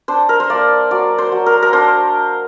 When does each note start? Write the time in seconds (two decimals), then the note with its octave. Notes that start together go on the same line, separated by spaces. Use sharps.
0.08 D4 C5
0.29 A#4
0.40 C5
0.50 A#3 D5
0.91 F#3 D5
1.18 C5
1.32 F#3
1.46 A#4
1.62 A#4
1.73 D4 C5